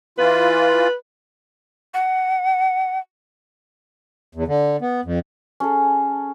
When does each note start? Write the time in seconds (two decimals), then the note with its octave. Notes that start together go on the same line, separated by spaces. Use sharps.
0.18 E3 F4 B4
1.94 F#5
4.35 E2
4.48 D3
4.81 B3
5.05 F2
5.60 C#4 G#4 A4